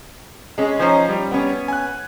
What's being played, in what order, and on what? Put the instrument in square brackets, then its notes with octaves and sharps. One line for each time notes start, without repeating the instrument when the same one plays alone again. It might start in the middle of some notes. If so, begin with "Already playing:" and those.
[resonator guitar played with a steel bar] G#3 C#4
[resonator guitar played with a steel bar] F3 D#4 [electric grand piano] C#4 C5 G#5
[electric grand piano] G3
[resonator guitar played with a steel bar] B3 C#4
[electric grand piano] G#5 F#6